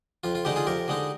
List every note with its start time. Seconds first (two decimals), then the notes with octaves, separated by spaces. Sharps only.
0.24 F2 F4
0.35 F4
0.45 D3 G#3 D#4 G4
0.56 F4 G#4
0.67 F2 G4 A#4
0.88 D3 G#3 D#4